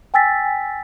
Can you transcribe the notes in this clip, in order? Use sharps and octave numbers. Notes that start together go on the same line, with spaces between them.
G5 G#5 E6 A6 B6